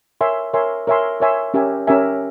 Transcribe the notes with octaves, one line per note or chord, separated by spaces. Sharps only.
A#4 C#5 E5 G#5 C6
A#4 C#5 E5 G#5 C6
A#4 C#5 E5 G#5 C6
A#4 C#5 E5 G#5 C6
C#4 G4 A#4 E5 G#5
C#4 G4 A#4 E5 G#5